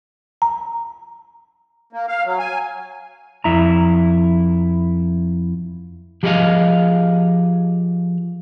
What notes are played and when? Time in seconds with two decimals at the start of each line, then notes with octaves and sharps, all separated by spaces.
0.42 A#5
1.93 A#3
2.08 F5
2.25 F#3
2.39 G#5
3.44 F2 E4 A#5
6.23 F3 G4 G#4 C#5 D#5 F5